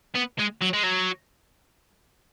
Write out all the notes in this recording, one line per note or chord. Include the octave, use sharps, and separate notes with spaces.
B3
G#3
F#3
G#3
F#3